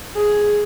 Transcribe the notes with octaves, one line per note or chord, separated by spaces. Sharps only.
G#4